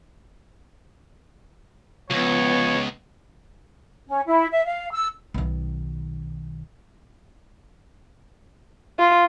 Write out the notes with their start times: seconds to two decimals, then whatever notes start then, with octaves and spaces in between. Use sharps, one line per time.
2.10 C#2 F3 B3 C#5
4.08 C#4
4.27 E4
4.51 E5
4.65 F5
4.91 E6
5.34 B1 D#3
8.99 F4